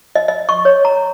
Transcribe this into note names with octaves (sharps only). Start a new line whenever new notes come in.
D#5
D#5
C#6
C#5
A#5